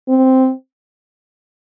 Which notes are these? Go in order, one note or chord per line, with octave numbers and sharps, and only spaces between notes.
C4